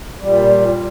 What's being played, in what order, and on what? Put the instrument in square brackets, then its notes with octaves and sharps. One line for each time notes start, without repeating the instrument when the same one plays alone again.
[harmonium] A#2 G3